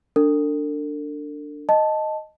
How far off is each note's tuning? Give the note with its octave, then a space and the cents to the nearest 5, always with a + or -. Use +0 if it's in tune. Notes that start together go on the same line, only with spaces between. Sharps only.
D4 +0 A4 +45
D#5 +0 A5 +0